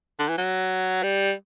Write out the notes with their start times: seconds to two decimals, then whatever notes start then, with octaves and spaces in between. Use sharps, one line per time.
0.19 D3
0.28 E3
0.37 F#3
1.03 G3